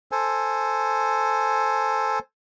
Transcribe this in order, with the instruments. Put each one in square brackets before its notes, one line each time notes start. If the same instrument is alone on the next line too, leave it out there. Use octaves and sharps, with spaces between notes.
[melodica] A4 C5 G#5